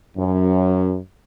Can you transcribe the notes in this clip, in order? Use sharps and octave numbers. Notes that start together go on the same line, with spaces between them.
F#2